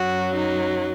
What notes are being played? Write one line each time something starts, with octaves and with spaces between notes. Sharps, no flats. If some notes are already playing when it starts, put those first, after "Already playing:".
Already playing: F#2 F#3 F#4
D#4